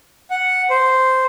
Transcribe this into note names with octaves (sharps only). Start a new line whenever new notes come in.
F#5
C5